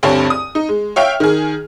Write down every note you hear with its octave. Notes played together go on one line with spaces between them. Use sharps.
D2 G2 C4 C#5 A5
D#6
D#4
G#3
C#5 E5 F5 G5 F6
D#3 G#4